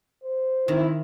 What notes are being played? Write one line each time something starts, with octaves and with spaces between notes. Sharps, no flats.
C5
D#3 C4 E4